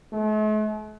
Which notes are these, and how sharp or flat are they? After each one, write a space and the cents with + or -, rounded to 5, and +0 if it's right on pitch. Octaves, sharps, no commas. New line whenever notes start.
A3 -45